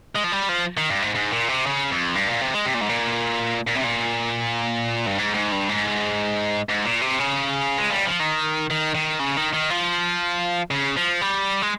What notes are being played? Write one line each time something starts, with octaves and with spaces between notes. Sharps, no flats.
G#3
F3
G3
F3
D#3
G2
G#2
G#2
A#2
C3
C#3
F2
G2
A#2
C3
G#3
C3
A#2
G#2
A#2
A#2
C3
A#2
G2
G#2
G#2
G2
G#2
G#2
A#2
C3
C#3
G#3
G3
F3
D#3
D#3
D#3
C#3
D#3
D#3
F3
C#3
F3
G3
G#3